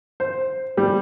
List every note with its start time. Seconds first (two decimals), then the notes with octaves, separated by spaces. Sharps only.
0.20 C5
0.77 G3